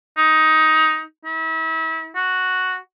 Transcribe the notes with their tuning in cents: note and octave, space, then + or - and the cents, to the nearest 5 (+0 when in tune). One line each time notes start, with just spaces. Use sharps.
D#4 +15
E4 -35
F#4 +0